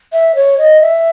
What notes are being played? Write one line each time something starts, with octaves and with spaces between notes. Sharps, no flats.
E5
C#5
D#5
E5